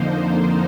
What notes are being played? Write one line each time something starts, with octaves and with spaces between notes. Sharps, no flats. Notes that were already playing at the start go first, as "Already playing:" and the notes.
Already playing: F2 D3 F3 A#3 D#4 C5